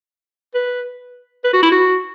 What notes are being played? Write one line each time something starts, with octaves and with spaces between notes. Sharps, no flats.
B4
B4
F#4
E4
F#4